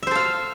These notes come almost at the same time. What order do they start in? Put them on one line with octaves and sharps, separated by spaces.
E5 C5 A4 F5